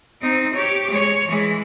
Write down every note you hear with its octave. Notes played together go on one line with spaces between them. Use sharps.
C4 D#4
G4 C#5
G#3 C#5
E3 G#3